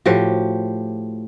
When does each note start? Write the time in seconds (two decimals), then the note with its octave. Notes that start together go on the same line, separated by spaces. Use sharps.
0.06 A2 F3 F#4 G4